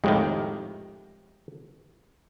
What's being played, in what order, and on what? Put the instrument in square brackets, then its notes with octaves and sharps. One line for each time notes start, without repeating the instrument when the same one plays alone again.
[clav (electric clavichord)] F2 A2 D#3 [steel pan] G#3 G4 D#5